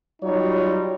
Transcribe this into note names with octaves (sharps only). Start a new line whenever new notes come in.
F#3 G3 D#4 F4 C#5